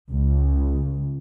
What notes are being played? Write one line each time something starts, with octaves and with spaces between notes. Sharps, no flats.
C#2